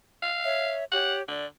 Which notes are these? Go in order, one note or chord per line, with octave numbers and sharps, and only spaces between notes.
F5
C#5 E5
G4 C#5 F#5
D3 D5